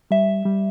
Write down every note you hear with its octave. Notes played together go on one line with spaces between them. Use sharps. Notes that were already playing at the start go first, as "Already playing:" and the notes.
G3 E5
G3